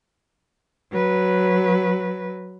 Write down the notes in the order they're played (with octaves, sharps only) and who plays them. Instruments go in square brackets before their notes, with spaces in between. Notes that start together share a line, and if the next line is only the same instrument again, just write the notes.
[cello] F#3 B4